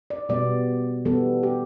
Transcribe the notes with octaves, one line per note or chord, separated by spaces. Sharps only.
D5
B2 G3 B3 D5
E3 G3 B3 A4
G4